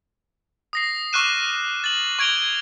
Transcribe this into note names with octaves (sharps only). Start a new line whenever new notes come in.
D#6 A#6 C7
C#6 D6 F6 F#6 D#7 E7
A6 F#7
C#6 G#6 D7 F7 G7